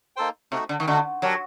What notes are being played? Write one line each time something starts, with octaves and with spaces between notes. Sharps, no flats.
A#3 D#4 A4 C5 G5
C3 A3 D#4 F#4
D3
D#3
D3 A3 D#4 F#4
F#3 D4 G4 A#4